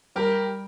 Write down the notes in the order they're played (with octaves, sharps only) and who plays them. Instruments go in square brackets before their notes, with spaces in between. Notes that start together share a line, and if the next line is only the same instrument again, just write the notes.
[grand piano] G3 [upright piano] G4 A#4